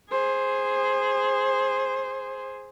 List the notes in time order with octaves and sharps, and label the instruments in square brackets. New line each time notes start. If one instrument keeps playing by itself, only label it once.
[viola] G#4 C5